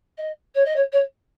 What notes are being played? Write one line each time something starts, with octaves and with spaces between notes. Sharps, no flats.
D#5
C#5
D#5
C#5
C#5